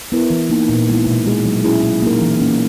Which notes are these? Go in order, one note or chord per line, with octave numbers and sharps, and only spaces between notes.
B3 E4 A#4
E3
A#3 D#4
A#2
G#3 B3 E4
B2
G#3 D#4 G#4
F#3
C#4 E4 G#4
B2
A#3 D#4 A#4
E3
A#3 C#4